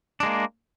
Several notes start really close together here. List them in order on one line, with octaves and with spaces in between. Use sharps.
D4 G#3 A#3